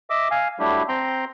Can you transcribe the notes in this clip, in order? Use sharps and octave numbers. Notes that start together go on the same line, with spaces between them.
D#5 E5 D6 E6
F5 G#5
F#3 G3 A3 D4 E4 G4
C4 G5 A#5 C6